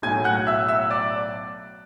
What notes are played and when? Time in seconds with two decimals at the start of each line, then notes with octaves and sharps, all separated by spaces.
0.02 B1 A2 F#3 G#5 G#6
0.24 F#5 F#6
0.47 E5 E6
0.68 E5 E6
0.90 D5 D6